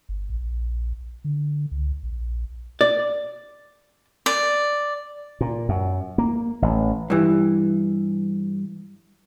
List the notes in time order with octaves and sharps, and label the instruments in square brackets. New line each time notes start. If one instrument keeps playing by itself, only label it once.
[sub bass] G1
A#1
D3
C#2
A#1
[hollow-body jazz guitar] D5
[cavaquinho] D5
[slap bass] A#2
F#2
A#3
A1
[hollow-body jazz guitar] G2 E3